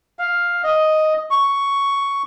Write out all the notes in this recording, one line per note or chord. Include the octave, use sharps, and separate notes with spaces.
F5
D#5
C#6